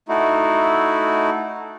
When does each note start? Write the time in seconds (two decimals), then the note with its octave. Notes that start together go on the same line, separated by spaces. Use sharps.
0.09 A3 D#4 E4 F#4